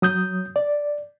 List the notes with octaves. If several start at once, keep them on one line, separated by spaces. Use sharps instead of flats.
F#3 D#6 G6
D5